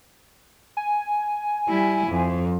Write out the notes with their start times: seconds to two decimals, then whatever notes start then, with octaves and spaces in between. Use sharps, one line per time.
0.77 G#5
1.69 G3 E4
2.08 F2